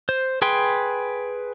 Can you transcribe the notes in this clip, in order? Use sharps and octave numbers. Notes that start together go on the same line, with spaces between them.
C5
G#4 B4 G5 C6